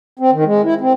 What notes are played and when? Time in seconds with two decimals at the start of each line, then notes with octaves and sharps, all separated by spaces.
0.19 C4
0.32 D#3
0.44 G#3
0.64 E4
0.80 C4